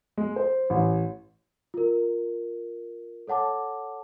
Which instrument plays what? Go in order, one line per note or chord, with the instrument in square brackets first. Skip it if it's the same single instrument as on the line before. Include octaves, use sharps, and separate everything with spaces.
[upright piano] G#3
C5
A1
[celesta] F4 A#4
A4 C#5 F#5 A5 D6